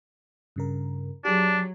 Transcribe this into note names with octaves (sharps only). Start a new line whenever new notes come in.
G2 C#3 A#4
F#3 D4 G4 G#4